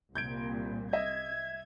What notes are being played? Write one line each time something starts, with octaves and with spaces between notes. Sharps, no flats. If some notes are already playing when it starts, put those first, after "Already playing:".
C2 A#2 G6 G#6 D7
D#5 E5 G#6